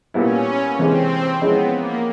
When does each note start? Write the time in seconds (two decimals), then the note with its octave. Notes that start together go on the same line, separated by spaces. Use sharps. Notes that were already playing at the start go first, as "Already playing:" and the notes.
0.14 A#2 G3 B3 C#4 E4
0.78 C3 E3 G#3 C4
1.41 F3 G#3 B3 C#4 E4
1.73 A#3